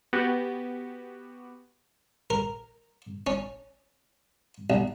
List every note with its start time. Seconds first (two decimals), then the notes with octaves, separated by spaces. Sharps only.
0.13 B3 F#4 G4
2.30 A#4
3.27 C#4
4.70 B1